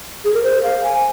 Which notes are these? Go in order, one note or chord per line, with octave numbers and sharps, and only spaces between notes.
G#4
A#4
C5
F5
G#5